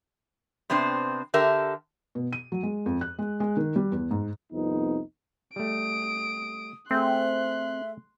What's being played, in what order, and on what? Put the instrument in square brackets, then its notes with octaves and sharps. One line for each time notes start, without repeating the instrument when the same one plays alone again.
[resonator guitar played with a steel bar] C3 B3 C4 D4 C5
D3 G4 A4 A#4 E5
[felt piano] B2
D#7
F#3
G#3
F2
F#6
G#3
G#3
D#3
G3
E2
G#2
[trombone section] C2 F2 B3 D#4
[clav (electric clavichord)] G3 A3 [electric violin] D#6 D7
[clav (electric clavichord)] A3 G#4 [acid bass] C4 [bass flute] E5 [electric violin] C6 F#6